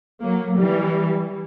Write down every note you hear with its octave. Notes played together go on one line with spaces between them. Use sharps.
F#3 A#3
E3 G3